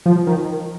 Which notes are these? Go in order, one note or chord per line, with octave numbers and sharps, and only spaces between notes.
F3
D#3